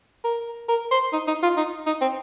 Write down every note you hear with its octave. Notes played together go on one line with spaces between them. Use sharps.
A#4
A#4
C5
D#4
D#4
F4
D#4
D#4
C4